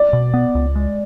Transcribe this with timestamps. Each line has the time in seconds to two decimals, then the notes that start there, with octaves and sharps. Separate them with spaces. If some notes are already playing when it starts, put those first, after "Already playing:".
Already playing: D5
0.13 B2
0.34 B3
0.55 C#2
0.75 G#3